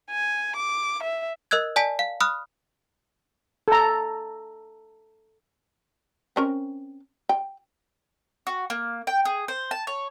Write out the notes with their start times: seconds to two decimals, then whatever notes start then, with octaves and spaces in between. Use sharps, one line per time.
0.11 G#5
0.56 D6
1.03 E5
1.51 A#4 D#5 E6 F#6 G#6
1.76 D5 G#5 A5 B6
1.99 F5
2.20 B5 D#6 F6 F#6
3.68 A4 A#5
6.36 C4 C#4 A#4
7.29 G5
8.47 F#4
8.70 A#3
9.07 G5
9.25 G#4
9.48 C5
9.71 A5
9.87 C#5